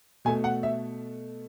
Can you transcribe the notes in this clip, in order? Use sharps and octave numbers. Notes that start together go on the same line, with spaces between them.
B2 A3 G#5
F#5
E5